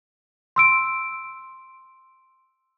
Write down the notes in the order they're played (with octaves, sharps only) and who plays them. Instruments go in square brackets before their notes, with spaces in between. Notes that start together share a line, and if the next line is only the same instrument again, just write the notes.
[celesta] C6 E6 D7